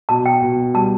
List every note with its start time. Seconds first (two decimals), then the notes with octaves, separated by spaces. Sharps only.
0.09 B2 A5
0.26 G5
0.42 B2
0.74 G3 A5